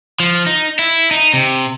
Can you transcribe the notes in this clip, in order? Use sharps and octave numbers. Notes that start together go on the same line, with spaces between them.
F3
D#4
E4
D#4
C3